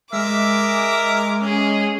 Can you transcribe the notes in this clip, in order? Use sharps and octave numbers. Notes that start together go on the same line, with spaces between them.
G#3 A#4 E5 D6
C#4 G#4